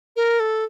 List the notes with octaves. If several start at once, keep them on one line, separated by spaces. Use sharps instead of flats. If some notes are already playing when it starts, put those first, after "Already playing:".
A#4
A4